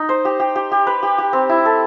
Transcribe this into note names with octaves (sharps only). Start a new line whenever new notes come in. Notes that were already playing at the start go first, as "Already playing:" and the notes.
Already playing: D#4
C5
G4
G4
G4
G4
B4
G4
G4
C4
E4
A4